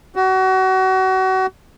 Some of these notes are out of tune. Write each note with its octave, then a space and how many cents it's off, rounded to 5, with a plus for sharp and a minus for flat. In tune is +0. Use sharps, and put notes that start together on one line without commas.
F#4 +30